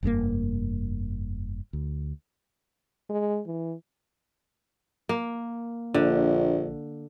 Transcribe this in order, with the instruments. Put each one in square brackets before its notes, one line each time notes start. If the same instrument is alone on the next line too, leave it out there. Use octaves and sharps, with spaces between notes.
[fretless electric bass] F1 G2 B2 A#3
D2
[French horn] G#3
E3
[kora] A#3
[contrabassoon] A#1 [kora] D3